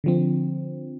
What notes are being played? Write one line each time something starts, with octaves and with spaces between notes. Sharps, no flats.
D3 F3 C4